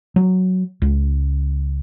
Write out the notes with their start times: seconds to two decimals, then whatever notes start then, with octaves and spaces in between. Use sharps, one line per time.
0.16 F#3
0.82 C#2